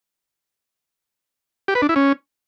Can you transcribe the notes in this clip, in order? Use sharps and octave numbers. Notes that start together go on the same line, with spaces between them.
G4
B4
D4
E4
C#4